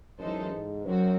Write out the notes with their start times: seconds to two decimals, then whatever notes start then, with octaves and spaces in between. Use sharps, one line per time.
0.19 F#2 E3 G#3 D#4 A4 C5
0.53 G#2
0.86 F#2 C3 F#3 C4 F#4